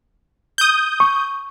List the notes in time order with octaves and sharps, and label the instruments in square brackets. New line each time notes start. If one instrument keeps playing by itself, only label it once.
[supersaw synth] D#6 G6
[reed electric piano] C#6